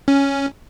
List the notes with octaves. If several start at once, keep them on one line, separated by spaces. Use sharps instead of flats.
C#4